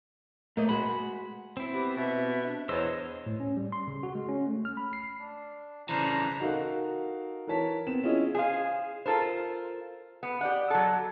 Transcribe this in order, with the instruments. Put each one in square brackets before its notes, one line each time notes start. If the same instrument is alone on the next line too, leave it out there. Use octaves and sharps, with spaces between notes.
[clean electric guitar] A3 [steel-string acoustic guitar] A#3 D#5
[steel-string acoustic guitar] G#3 F#4 [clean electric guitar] B5
[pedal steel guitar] C4 E4
[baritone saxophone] B3 [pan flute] G4
[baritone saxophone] B2 [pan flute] E5
[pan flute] D4
[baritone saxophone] E2 [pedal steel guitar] C5 D#5 E6 [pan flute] C#5
[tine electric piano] A2
C#4
G3
C6
C#3
F#4
G#3
C#4
A3
F6
B5
C7
[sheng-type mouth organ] D4
[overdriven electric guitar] C#3 E3 [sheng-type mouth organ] D4 C5 F#6 [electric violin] A#5
[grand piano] D#4 F#4 A4 A#4 F5
E3 A#4 C#5 A5 B6
B3 C4 E7
C#4 E4 F4 G#4 D#5
[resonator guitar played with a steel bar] G#4 C5 F5
F4 A4 A#4 C5
B3
G4 D5 F#5
F#3 A4